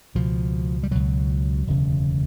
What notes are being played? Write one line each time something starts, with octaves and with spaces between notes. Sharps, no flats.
C#2 B2 F3
G3
C#2 B2 F#3
E1 D2 C#3